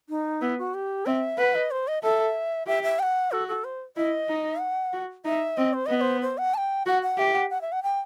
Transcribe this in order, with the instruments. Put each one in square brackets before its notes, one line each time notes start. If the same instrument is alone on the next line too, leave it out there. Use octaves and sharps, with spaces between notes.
[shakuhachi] D#4
[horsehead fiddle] B3 [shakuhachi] E4
[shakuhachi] F#4
G4
[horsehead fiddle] C4 [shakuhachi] E5
[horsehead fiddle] B4 [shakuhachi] F#5
[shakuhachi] D#5
C5
D#5
[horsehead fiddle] A4 [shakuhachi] E5
[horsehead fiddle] G4 [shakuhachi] E5
[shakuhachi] E5
G5
F#5
[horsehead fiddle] F#4 [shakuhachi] A4
[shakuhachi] A4
C5
[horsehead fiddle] E4 [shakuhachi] D#5
[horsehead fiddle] D#4
[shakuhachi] F#5
[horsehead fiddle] F#4
[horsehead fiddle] D#4 [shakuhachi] E5
[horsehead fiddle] C4 [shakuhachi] D#5
[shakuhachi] C5
[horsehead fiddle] B3 [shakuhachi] D#5
[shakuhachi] D#5
C5
C5
F#5
A5
G5
[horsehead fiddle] F#4 [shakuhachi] F#5
[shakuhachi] F#5
[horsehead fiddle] G4 [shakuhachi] E5
[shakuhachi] F#5
F#5
E5
F#5
G5